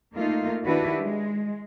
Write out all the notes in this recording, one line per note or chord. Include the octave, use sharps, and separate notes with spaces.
A3 A#3 D#4 F4
D#3 D4 E4 F#4 G4 B4
G#3